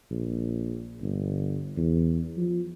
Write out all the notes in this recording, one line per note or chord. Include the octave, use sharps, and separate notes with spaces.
A#1
G1
E2
F3